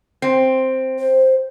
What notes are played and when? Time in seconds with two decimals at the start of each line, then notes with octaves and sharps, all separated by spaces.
0.22 C4
0.99 C5